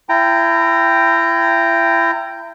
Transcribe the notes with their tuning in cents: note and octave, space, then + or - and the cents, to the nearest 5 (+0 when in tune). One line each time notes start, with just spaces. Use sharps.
E4 +30 G5 +0 A#5 -15